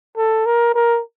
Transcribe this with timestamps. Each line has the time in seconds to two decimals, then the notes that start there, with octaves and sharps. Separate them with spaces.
0.16 A4
0.46 A#4
0.75 A#4